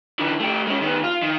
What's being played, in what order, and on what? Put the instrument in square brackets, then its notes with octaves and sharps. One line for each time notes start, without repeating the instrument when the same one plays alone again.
[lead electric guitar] D3 E3
A3 G4
G#3 C#4
D#3 B3
F4
D#3